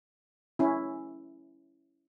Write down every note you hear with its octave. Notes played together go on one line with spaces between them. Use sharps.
C#4 E4